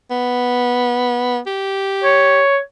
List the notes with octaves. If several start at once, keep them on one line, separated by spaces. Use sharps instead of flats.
B3
G4
C#5